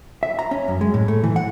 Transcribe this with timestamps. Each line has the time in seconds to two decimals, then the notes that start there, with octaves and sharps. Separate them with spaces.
0.23 E5
0.39 A#5
0.51 C#4
0.68 F#2
0.81 G#3
0.94 A2
1.08 A3
1.23 E3
1.36 F#5